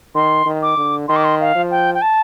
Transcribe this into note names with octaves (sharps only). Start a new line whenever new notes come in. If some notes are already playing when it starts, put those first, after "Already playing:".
D#3 C6
D#3
D6
D3
D#3 C6
D6
C6
F5
F3
G5
G5
A5